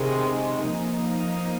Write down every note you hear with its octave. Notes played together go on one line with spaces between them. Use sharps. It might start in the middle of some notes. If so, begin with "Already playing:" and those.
Already playing: C3 D#3 G#3
F3 A#3 D#4